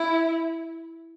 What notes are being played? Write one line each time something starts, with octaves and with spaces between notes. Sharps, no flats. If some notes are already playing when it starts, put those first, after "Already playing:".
Already playing: E4